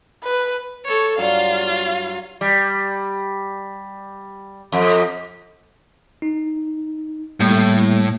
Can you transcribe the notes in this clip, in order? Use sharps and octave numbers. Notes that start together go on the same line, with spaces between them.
B4
A4 C#5
G2 F#3 F4 F5
G3
F2
D#4
A2 G3 A#3